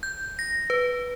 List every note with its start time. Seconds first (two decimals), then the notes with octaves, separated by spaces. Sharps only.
0.03 G6
0.39 A#6
0.70 B4